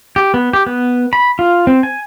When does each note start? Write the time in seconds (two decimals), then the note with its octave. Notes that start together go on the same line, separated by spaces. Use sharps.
0.16 G4
0.34 B3
0.53 G4
0.66 B3
1.13 B5
1.39 F4
1.67 C4
1.83 G#5